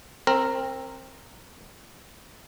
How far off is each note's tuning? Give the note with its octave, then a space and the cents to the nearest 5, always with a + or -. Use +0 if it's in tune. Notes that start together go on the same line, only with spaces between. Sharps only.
C4 +15 A#4 -10